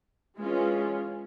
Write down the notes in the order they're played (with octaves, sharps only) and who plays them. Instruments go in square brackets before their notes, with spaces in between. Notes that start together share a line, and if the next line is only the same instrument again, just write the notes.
[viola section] E3 G#3 C#4 F4